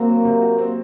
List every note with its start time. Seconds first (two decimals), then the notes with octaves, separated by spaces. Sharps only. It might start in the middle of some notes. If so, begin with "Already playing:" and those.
Already playing: A#3 C4 F#4
0.09 F#3
0.25 C3
0.42 F#4
0.58 C4